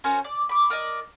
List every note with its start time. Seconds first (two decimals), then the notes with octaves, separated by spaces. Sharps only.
0.04 C#4 F#4 A#4 C5
0.24 D5
0.49 B5 D6
0.70 A#4 D5 D#5